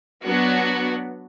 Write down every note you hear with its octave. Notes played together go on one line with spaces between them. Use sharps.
F#3 B3 D4 F#4